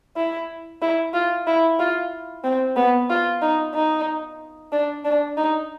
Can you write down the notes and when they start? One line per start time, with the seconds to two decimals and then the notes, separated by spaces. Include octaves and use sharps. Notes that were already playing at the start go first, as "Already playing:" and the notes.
0.17 E4
0.82 E4
1.14 F4
1.47 E4
1.79 F4
2.44 C4
2.76 B3
3.10 F4
3.42 D#4
3.74 D#4
4.72 D4
5.05 D4
5.37 D#4